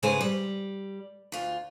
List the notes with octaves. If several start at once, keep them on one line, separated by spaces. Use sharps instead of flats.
G#2 C#3 G#3 G#4 B4 C5
G3
D2 F4